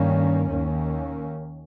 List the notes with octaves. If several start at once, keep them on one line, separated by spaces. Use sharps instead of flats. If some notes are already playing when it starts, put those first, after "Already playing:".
Already playing: G2 D#3 A#3 C#4
D#2 D#3 A#3 C#4